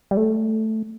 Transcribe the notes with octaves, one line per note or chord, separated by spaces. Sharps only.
G3
A3